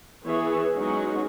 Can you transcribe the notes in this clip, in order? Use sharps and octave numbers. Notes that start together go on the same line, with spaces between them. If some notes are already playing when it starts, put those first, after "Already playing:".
E3 B3 G#4 B4 C#5 E5
F#3 G#3 B3 C#4 D#4 F#4